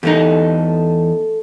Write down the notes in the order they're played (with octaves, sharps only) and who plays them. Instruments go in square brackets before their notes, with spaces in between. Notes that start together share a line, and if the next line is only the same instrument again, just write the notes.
[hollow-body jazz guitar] E2 D#4 [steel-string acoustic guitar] A3 A4